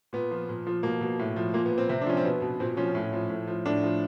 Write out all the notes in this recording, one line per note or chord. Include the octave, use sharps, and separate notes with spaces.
A#2 B3
F3
A#2
F3
B2 A#3
B2
A2
F3
A#2 A#3
B3
F3
C4
C3 C4
D4
F3 C#4
C4
B2 B3
B2
A#2 C4
F3 C#4
A2
F3
A2
F3
A2 D4
F3